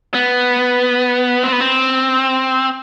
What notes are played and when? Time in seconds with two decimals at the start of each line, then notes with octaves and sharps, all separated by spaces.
0.14 B3
1.43 C4
1.52 B3
1.60 C4